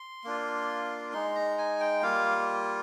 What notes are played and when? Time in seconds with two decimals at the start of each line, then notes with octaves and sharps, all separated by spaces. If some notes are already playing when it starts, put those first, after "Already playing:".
Already playing: C6
0.24 A#3 D4 F4
1.13 G#3 D#4 C6
1.35 A#5
1.58 G#5
1.80 G5
2.02 G3 A#3 F4 F5